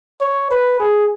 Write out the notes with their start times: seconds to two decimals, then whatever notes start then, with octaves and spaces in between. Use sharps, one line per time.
0.21 C#5
0.51 B4
0.80 G#4